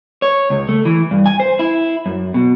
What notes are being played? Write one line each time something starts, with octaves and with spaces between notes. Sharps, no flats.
C#5
C#2
A3
E3
G2
G#5
C5
E4
F#2
B2